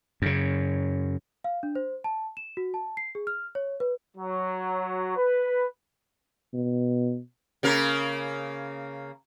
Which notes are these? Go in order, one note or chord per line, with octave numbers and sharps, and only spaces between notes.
F#2 C#3
F5
D4
C5
A5
E7
F#4
A5
C7
G#4
F6
C#5
B4
F#3
B4
B2
C#3 A#3 A#4